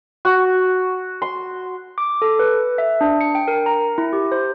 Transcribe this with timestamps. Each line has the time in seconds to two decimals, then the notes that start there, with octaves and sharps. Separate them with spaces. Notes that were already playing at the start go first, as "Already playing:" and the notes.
0.25 F#4
1.22 C6
1.98 D6
2.22 A4
2.39 B4
2.78 E5
3.01 D4
3.21 C#7
3.35 G5
3.48 A#4
3.66 A#5
3.98 E4
4.13 G4
4.32 C5